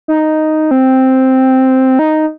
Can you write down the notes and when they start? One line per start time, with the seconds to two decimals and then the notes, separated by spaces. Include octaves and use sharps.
0.08 D#4
0.71 C4
1.99 D#4